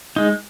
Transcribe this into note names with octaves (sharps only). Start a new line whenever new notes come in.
G#3 D#4